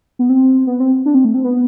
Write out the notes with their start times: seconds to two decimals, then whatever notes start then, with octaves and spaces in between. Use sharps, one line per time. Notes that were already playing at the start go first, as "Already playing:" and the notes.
0.19 B3
0.29 C4
0.67 B3
0.80 C4
1.06 D4
1.15 C4
1.25 A3
1.34 C4
1.44 B3